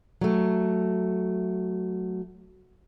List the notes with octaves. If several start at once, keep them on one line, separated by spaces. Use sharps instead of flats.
F#3 A3